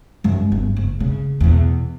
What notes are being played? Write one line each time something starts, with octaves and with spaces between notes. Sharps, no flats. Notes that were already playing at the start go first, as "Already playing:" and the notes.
F#2 G#3
G1
F#1
C#3
E2 B2